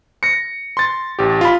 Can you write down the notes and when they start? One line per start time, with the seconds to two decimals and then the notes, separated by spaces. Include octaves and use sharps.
0.23 A#6 C#7
0.77 C6 A6
1.19 A1 G4
1.41 F4 B5